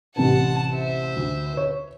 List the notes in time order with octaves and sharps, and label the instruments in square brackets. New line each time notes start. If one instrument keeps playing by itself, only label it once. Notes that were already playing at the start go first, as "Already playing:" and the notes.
[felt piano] A1 C3 B4 [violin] F#5 A5
[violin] C5 E5
[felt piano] D2
B4 C#5